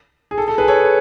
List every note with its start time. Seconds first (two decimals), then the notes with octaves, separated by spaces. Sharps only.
0.31 G#4
0.38 A4
0.48 A4
0.58 G#4 B4
0.68 A4 C#5